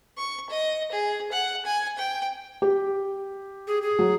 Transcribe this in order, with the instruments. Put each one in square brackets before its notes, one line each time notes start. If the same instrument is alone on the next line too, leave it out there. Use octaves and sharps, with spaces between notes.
[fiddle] C#6
D#5
G#4
F#5
G#5
G5
[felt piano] G4
[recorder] G#4
G#4
[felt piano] F#3